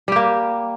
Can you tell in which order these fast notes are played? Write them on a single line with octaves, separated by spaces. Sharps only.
G3 G4 A#3